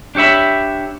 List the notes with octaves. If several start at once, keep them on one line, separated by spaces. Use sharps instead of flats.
D4 G4 C#5 E5 B5